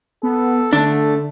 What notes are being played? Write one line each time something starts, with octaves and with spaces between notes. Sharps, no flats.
B3 A4
D3 A3 D4